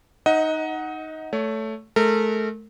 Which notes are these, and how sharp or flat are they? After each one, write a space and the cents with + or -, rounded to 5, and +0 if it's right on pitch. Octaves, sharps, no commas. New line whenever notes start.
D#4 +0 D#5 +25 F#5 +0
A3 +0 C#5 +25
A3 -35 A#4 -35